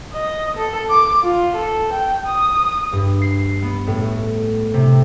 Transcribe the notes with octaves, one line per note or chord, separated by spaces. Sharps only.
D#5
A4
D6
F4
A4
G5
D#6
G2
C7
B3
A2
C3